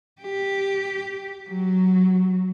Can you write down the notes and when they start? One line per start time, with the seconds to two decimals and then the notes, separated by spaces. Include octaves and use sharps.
0.22 G4
1.48 F#3